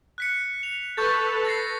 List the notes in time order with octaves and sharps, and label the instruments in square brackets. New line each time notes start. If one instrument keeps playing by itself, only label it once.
[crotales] F#6 B6 C#7
F7
[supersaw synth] A4 B4 [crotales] C#6 G6 A6
[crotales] A6 A#6 C7